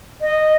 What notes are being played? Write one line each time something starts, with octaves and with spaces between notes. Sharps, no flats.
D#5